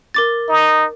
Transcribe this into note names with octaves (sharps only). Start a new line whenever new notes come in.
A#4 D6 A6
D#4